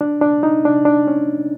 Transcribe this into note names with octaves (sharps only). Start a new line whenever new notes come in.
D4
D4
D#4
D4
D4
C#4